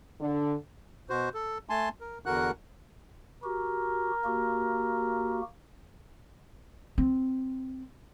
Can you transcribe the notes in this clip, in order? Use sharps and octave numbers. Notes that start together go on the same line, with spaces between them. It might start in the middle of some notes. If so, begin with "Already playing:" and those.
D3
B2 F#4 C5
A4
A3 G#5 A5 C6
A#4
E2 D3 F#4 A#4 F#5 F#6
F#4 G4 A#4
A#3 F#4 G4
C4